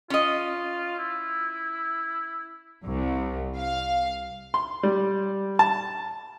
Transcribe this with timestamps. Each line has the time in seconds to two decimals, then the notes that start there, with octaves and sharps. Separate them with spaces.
0.10 C#4 F4 D#5
0.98 E4
2.84 C2
3.57 F5
4.54 C6
4.83 G3
5.59 A5